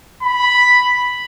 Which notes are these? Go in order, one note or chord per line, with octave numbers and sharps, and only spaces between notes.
B5